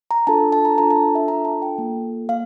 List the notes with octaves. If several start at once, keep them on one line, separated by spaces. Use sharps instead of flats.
A#5
D4 F4 A4 A5
A5
A#5
D4 F4 A4 A#5
A5
E5
D4 F4 A4 A#5
A5
G5
A#3 F4 A4
A#3 F5